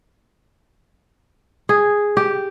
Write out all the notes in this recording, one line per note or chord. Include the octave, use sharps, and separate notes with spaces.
G#4
G4